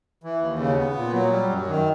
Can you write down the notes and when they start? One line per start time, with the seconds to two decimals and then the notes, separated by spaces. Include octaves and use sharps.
0.24 E3
0.41 D#2
0.59 C#3
0.77 B3
0.96 A#2
1.13 F#3
1.32 G3
1.50 F#2
1.67 D#3